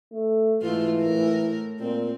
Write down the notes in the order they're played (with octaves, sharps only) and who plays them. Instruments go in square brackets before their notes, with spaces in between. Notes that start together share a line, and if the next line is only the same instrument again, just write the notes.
[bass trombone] A3
[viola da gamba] G#2 A3 F4 [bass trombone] E3
[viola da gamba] A2 A#4
[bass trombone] A#2 [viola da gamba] C4